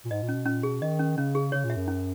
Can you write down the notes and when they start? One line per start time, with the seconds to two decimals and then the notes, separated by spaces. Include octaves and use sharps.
0.05 A#2
0.11 G#2 D#5
0.22 A#2
0.29 C#4
0.35 B2
0.46 A#2 C#4
0.63 B2 G#4
0.81 D#3 D#5
0.99 C#4
1.17 C#3 C#4
1.35 G#4
1.52 C#3 C#5
1.65 A#2
1.70 E5
1.76 F#2
1.88 C#4